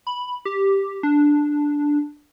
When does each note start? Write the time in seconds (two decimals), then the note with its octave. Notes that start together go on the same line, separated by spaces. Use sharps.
0.07 B5
0.45 G4
1.03 D4